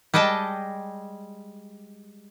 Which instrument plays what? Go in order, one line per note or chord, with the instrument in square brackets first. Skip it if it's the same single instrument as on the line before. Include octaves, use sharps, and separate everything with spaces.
[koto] G3 G#3 D#5 G5 A5